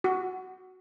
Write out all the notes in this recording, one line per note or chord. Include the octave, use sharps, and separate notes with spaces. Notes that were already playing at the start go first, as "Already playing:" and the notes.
F#4